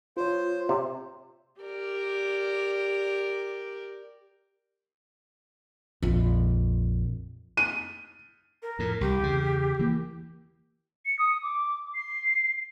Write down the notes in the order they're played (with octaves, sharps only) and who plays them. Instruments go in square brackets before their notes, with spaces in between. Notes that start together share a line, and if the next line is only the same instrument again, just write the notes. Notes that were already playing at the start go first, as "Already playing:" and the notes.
[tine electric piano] F4 C#5 [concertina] C5
[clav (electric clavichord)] C3
[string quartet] G4 A#4 D5
[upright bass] A#1 F2
[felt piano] D#7
[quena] A#4
[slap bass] F2 A2
[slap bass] C2 [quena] G4
[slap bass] E2 C#3
E3 A#3
[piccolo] C#7
D#6
D6
C7